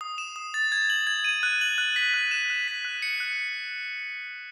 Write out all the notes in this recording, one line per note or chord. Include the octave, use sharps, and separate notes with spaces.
D#6
E7
D#6
A6
G#6
F#7
G#6
D#7
F#6
F#7
F#6
B6
F#6
E7
F#6
B6
F#6
C#7
F#6